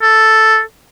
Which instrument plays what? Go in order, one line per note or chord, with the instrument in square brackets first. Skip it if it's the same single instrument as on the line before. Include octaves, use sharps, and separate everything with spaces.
[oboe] A4